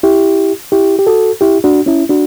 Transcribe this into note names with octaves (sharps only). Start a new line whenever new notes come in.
E4 G4
E4 G4
G4
F#4 A4
E4 G4
D4 F#4
C#4 E4
D4 F#4